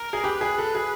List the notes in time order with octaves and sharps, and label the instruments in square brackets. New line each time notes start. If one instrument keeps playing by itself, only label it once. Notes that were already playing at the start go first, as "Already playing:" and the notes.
Already playing: [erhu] A#4
[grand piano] G#4
[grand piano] G4 [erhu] B4
[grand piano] G#4
A4
G#4